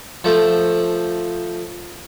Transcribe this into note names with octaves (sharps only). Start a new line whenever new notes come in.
F3 A3